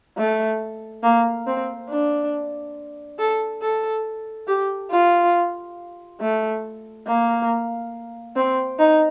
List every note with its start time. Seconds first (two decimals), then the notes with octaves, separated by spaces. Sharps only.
0.18 A3
1.03 A#3
1.47 C4
1.89 D4
3.19 A4
3.62 A4
4.48 G4
4.91 F4
6.20 A3
7.07 A#3
8.36 C4
8.79 D#4